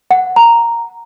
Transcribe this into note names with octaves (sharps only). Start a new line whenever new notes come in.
F#5
A#5